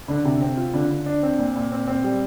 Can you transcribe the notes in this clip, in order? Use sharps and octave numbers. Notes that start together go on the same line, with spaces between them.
D3
C3
C4
F4
D3
D3
D4
C4
A#2
A#2
C4
C4
G3